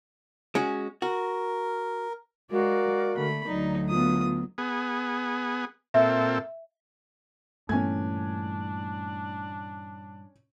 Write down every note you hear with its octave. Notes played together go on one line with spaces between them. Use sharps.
G#3 C#4 F#4
F#4 A#4
G#3 F#4 A#4 D5 F5
D3 A3 B5
D2 F#3 D#4 D5 A#5
B3 F4 D#6
B3 G#4
A#2 C4 A4 E5
G2 A#2 E3 A3 C#4 D4 G#5 G#6